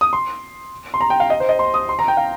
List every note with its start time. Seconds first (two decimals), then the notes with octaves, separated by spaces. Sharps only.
0.01 D#6
0.13 C6
0.94 C6
1.01 A#5
1.10 G5
1.20 F5
1.30 D#5
1.40 C5
1.49 D#5
1.59 C6
1.74 D#6
1.89 C6
1.99 A#5
2.08 G5
2.17 F5